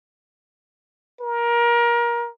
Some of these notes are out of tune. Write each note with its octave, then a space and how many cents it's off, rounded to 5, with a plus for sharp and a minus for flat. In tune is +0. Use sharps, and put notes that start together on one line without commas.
A#4 +25